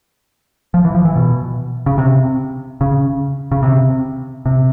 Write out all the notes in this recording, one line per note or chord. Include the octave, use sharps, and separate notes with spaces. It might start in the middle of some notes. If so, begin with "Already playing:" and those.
F3
E3
F3
E3
B2
C#3
C3
C#3
C#3
C3
C3